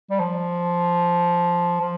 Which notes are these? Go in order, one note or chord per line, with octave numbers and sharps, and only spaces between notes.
G3
F3
F3